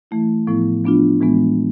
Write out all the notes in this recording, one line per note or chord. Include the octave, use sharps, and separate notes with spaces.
E3 A3 E4
A2 F3 B3 E4
F3 B3 D4 F4
A2 E3 G#3 B3